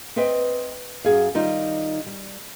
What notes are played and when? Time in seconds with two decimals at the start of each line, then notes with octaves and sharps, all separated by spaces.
0.16 C4 B4 D#5 E5 G5
1.05 F#2 G#4 F5
1.35 D#3 G3 D#4 F4
2.06 G3